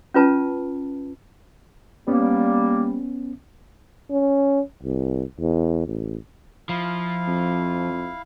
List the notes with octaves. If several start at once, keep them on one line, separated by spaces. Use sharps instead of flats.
C#4 F4 B4 A5
G3 A#3 B3 C#4
C#4
C2
E2
A1
F3 E4 F5
F2